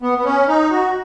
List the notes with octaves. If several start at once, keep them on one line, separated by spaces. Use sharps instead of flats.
B3
B3
C#4
D#4
F#4